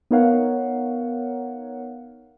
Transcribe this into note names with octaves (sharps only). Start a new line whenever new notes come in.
B3 D#4 A#4 C#5 F5 F#5